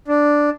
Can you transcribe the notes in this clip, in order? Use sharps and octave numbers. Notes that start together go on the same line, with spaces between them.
D4